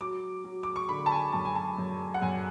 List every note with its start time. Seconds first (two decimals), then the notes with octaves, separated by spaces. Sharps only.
0.01 F#3 D6
0.44 F#3
0.63 D6
0.76 C#6
0.89 D3 B5
1.06 A5
1.12 G#5
1.32 F#2 A5
1.45 G#5
1.55 A5
1.78 F#2
2.14 F#5
2.22 F#2 G#5